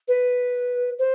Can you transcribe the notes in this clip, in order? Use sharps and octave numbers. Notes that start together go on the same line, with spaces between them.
B4
C5